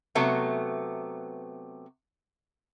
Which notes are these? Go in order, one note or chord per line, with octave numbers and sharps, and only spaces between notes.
C3 F#3 A3 B3